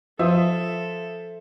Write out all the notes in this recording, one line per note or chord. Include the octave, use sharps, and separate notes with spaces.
F3 F4 A4 C5 E5 D#6